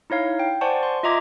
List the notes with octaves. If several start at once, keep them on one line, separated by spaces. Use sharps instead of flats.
D#4 E4 C#5 F5
G5
C5 D5 F#5 G#5 A5 C#6
C6
F4 D#5 E5 A#5 D6 G#6